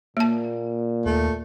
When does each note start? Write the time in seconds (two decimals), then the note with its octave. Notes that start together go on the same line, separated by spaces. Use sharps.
0.17 A#2 A#3 A5
1.06 D#2 A3